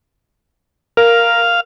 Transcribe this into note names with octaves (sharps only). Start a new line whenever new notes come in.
A#4 F5